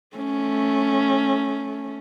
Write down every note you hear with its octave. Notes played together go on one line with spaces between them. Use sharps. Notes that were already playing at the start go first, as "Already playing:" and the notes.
A3 C#4